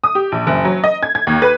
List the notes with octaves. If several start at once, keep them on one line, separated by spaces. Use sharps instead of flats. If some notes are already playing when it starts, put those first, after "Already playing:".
D#6
G4
A#1
F#1
F#3
D#5
G#6
G#6
D#2
B4